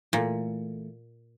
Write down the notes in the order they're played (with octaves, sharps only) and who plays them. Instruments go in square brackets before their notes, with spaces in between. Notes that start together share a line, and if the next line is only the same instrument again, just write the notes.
[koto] A#2 [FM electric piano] E3 A3